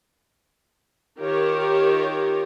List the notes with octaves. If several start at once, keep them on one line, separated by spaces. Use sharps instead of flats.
D#3 F4 G4 A#4 C#5